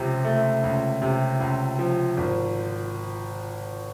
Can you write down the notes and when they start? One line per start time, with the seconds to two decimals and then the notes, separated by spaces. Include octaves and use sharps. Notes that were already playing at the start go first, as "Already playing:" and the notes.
Already playing: C#2 C3 F3
0.25 A3
0.64 C#2
1.02 C3
1.40 C#2
1.79 F3
2.17 G#1